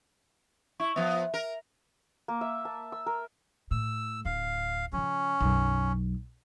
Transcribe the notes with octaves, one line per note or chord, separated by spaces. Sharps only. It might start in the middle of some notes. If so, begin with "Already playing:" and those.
E4 C#6
F3 B3 E5
A#4
A#3
E5
A5
E6
A#4
A2 E6
D1 F5
C#3 F3 C#4
B1 F#2